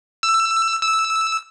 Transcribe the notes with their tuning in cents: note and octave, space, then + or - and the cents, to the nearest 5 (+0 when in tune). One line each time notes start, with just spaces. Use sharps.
E6 +15
E6 -5